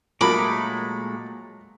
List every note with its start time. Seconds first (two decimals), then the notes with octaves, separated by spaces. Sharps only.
0.21 A#2 F3 F#3 G#3 A3 A#4 B5 D6